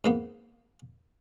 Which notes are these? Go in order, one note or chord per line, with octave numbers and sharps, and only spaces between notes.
G#2 A#3 B3